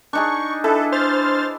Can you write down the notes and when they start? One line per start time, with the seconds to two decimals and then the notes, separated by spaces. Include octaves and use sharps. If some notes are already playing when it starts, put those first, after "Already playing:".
0.13 D4 D#4 G#4 C#6
0.64 D4 E4 A4 B4
0.92 C5 F6 A6